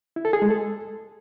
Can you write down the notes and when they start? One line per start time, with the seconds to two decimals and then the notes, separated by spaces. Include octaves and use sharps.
0.16 E4
0.25 A4
0.33 G#4
0.42 G#3
0.50 A4